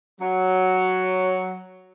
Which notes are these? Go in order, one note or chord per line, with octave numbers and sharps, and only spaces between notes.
F#3